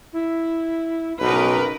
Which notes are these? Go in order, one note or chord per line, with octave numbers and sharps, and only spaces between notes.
E4
B1 C#3 D#4 A#4 B4